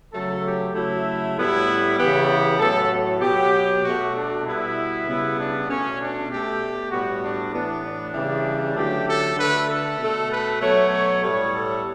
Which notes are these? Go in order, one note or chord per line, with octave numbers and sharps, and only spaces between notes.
C#3 F#3 A3 A4
G4
C#3 F#3 A3 E4
A2 G3 B3 E4
C#3 E3 B3 G4
G4
A2 F#3 B3 A4
B2 F#3 B3 G4
B2 A3 F#4
D4
B2 G3 B3 E4
C#3 G3 B3
D4
B2 A3 C#4
D4
B2 A3 G4
A2 G3 B3 F#4
D4
A2 E3 B3 D4
D4
C#3 E3 G3
D3 F#3 A3 G4
A4
D3 A3 B4
A4
B2 A3
B4
B2 F#3 A3 C#5
C#5
A2 G3 B3 C#5
A4